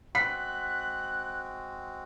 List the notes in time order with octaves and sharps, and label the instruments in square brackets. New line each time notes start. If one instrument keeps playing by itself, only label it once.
[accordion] G#3 C4 F#4 [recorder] F#6 [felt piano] B6